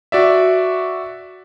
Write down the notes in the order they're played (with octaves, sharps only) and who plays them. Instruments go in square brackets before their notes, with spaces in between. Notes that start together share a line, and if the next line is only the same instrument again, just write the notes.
[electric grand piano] F#4 D5 E5